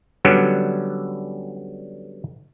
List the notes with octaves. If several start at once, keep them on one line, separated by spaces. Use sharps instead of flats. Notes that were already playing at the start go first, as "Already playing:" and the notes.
D3 F#3 G3 B3 C#4